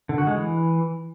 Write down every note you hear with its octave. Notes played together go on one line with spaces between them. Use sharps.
D3
F#4
G#3
E3